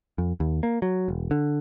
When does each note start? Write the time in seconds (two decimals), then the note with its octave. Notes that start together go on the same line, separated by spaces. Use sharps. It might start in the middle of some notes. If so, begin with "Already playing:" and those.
0.18 F2
0.40 D#2
0.63 A#3
0.82 F#3
1.08 E1
1.31 D3